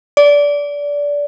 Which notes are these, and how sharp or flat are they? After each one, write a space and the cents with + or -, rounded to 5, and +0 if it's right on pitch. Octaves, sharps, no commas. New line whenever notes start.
D5 -20